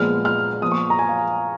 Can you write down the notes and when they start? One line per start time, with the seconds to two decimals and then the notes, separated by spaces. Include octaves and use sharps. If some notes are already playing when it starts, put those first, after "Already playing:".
Already playing: A#2 F3 G#3 B3 F6
0.25 F6
0.62 A#2 F3 B3 D#6
0.72 C#6
0.90 A#5
0.99 G#5
1.09 F5